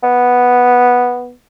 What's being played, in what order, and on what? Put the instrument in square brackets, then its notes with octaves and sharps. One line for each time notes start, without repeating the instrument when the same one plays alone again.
[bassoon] B3